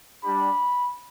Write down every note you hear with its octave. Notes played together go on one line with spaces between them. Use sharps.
G3 D4 G4 B5